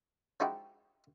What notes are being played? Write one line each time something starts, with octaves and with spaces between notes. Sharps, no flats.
F3 G#3 D#4 E4 F#4 G4